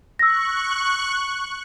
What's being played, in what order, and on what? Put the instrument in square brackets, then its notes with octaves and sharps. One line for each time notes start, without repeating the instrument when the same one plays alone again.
[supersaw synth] C#6 F#6 [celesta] E6 A#6